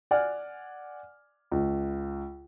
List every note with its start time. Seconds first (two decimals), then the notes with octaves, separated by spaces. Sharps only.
0.11 D5 F#5 G#5 F6
1.51 C#2